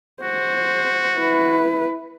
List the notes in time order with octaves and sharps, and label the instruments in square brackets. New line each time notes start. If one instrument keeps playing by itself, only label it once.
[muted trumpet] F#4 [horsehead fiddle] C5
[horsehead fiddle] E4 B4